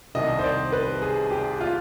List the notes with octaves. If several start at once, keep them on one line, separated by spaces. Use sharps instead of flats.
C2 C3 D#3 G3 D#5
C5
D5
B4
G#4
G4
F4